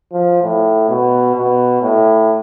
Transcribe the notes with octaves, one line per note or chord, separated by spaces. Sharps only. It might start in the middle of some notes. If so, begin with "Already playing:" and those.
F3
A2
B2
B2
A2